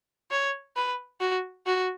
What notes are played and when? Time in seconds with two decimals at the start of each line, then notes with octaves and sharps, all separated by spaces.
0.31 C#5
0.76 B4
1.20 F#4
1.66 F#4